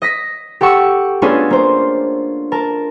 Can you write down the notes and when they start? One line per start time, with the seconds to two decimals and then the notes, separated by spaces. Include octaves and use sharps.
0.02 D#5 A#6 B6
0.61 G4 A4 F#5 C#6 E6
1.22 A3 B3 C#4 D4 F4 G#4
1.50 A#3 C5
2.52 A#4 A5